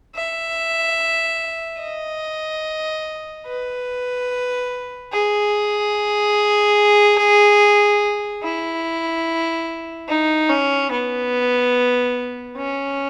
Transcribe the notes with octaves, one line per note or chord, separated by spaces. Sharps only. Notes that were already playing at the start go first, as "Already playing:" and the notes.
E5
D#5
B4
G#4
E4
D#4
C#4
B3
C#4